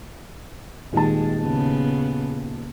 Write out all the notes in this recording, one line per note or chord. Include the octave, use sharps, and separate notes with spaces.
D#1 D#3 G#3 A5
C#3 B3